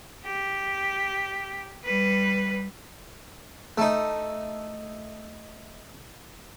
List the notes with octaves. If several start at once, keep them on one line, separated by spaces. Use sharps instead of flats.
G4
G3 B4
A3 D#4